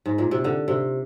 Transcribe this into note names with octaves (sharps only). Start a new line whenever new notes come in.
G#2
A#2
C3
D3
C3